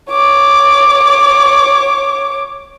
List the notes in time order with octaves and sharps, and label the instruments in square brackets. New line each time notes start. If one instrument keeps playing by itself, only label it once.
[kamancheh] C#5 D6